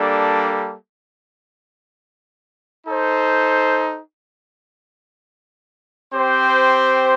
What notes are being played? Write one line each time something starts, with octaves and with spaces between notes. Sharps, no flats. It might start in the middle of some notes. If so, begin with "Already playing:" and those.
Already playing: G3 A#3 D4 A4
D#4 A4 C5
C4 G4 C5